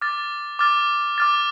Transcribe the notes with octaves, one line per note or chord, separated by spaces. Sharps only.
D6 F6 A6
D6 F6 A6
D6 F6 A6